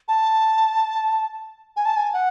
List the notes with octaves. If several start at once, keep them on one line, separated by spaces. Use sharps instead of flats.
A5
G#5
A5
G#5
F#5